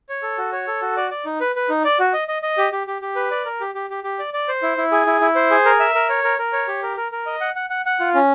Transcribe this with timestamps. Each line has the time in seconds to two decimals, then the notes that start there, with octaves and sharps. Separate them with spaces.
0.09 C#5
0.23 A4
0.38 F#4
0.52 C#5
0.67 A4
0.82 F#4
0.97 D5
1.11 D5
1.25 D#4
1.41 B4
1.56 B4
1.69 D#4
1.84 D5
1.99 F#4
2.13 D#5
2.28 D#5
2.42 D#5
2.58 G4
2.72 G4
2.87 G4
3.02 G4
3.16 B4
3.31 D5
3.45 A#4
3.61 G4
3.75 G4
3.90 G4
4.04 G4
4.19 D5
4.34 D5
4.48 C5
4.63 E4
4.78 E4
4.92 G#4
5.07 E4
5.21 E4
5.35 C5
5.51 G#4
5.65 A#4
5.80 E5
5.95 A#4
6.09 C#5
6.24 A#4
6.39 A#4
6.53 C#5
6.68 G4
6.83 A#4
6.97 A#4
7.12 A#4
7.26 D#5
7.41 F#5
7.56 F#5
7.70 F#5
7.86 F#5
8.00 F4
8.14 C#4